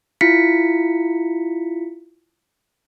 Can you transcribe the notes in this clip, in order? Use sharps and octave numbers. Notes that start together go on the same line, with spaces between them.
E4 F4 B6 C#7